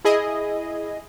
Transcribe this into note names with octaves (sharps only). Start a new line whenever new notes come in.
E4 G#4 D#5